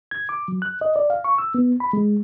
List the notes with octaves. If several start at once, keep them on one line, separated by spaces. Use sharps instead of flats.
G#6
D6
F#3
F#6
D#5
D5
F5
C#6
E6
B3
B5
G#3